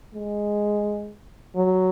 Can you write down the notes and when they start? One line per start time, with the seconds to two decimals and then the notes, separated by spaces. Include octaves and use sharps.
0.14 G#3
1.56 F#3